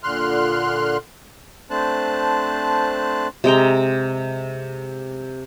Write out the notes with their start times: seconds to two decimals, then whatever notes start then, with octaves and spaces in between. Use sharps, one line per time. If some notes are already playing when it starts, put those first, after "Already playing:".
0.03 A#2 D3 C6 F6 F#6
1.70 A3 C4 D4 C5 A5 F#6
3.44 C3 G#3 G5 A#5